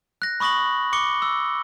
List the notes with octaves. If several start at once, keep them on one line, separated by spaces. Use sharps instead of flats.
F#6 A#6
B5 C#6 D#6 A#6 F#7
D6 C#7 G7
E6